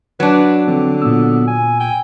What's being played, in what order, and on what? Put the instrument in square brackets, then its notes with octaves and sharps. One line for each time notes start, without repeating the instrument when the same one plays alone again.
[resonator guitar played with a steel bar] F#3 D4 [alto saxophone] B4
[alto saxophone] D3 [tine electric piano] F3 C4
[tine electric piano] A#2 E6 [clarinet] B3
[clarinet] G#5
[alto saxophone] G5 [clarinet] G#5